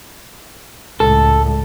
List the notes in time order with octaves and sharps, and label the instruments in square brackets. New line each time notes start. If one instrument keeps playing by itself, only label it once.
[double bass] C#2 A2 [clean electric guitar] A4